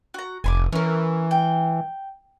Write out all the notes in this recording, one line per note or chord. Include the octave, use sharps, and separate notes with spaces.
F#4 A#5
F1 G#5 B5 D6
E3 C#4 A#4
G5